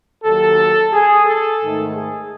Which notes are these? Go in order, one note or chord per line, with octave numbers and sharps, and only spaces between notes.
D#2 D#3 F#3 A4
G#4
A4
G#2 D#3 A3
G#4